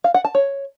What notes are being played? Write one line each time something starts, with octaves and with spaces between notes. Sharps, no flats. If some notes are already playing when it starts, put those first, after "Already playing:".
F5
F#5
A5
C#5